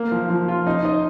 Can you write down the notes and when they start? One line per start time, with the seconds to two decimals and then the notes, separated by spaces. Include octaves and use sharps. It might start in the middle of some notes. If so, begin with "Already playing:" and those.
Already playing: A#3
0.12 F3
0.30 F3
0.48 F4
0.67 D#4
0.85 D#5